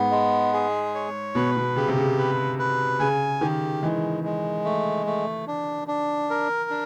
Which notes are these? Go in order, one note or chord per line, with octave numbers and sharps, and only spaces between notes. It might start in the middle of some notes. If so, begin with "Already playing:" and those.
Already playing: G#2 B3
G#3
G#4
C#5
B2 B4
B2
C#3 G4
C3
C#3
B4
B4
C#3 G#5
D#3 G4
E3 G#3
G#3
A3
A3
D4
D4
A#4
D4